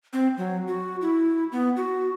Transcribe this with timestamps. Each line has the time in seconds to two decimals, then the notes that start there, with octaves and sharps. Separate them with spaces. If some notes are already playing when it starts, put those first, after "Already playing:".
0.13 C4
0.37 F#3
0.67 F#4
1.01 E4
1.52 B3
1.76 F#4